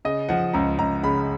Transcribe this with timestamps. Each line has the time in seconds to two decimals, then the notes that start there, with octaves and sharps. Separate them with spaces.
0.05 C#3 D#5
0.29 F3 F#5
0.53 C#2 A#5
0.78 C#2 A#5
1.03 C#3 B5